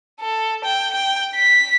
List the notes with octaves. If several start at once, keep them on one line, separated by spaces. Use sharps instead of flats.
A4
G5
G5
B6